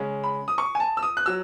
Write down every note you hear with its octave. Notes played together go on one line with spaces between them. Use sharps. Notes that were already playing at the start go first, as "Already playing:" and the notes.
Already playing: C#3 G#3 C#4
B5
D#6
C#6
G#5
A5
E6
D#6
F#6
F#3 E6